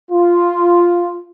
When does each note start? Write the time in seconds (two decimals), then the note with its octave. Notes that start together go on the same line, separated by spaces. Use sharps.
0.10 F4